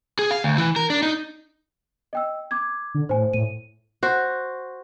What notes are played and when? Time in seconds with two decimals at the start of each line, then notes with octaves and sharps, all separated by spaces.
0.19 G#4
0.31 F5
0.44 D2
0.58 E3
0.76 A#4
0.90 D4
1.03 D#4
2.13 D#5 G5 E6
2.51 D6 G#6
2.95 D3
3.09 A2 C5 G#5
3.33 A2 D#7
4.03 F#4 C5